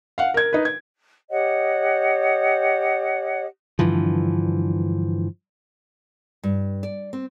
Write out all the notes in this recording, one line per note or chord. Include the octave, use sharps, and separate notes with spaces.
F5 F#5
A#4 G#6
D#4 B4
G#6
G4 C#5 D#5 F#5
G2 D3 E3 F3
G2
D5
C4